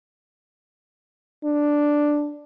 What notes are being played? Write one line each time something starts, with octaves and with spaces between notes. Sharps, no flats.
D4